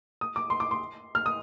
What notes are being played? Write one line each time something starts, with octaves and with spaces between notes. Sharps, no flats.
D#6
D6
C6
D6
C6
F6
D#6